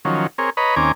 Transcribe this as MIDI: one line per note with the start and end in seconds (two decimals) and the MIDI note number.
0.05 0.27 51
0.05 0.27 53
0.05 0.27 54
0.05 0.27 61
0.38 0.50 60
0.38 0.50 68
0.38 0.50 70
0.38 0.50 73
0.57 0.75 71
0.57 0.75 73
0.57 0.75 75
0.57 0.75 82
0.57 0.75 83
0.76 0.92 39
0.76 0.92 60
0.76 0.92 61
0.76 0.92 80
0.76 0.92 82
0.76 0.92 86